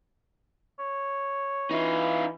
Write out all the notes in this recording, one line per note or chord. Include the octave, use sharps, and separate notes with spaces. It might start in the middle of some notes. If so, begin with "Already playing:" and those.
C#5
E3 D#4 F4